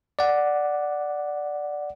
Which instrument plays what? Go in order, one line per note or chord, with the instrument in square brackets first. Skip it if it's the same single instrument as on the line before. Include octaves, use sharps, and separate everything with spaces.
[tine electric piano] D5 F#5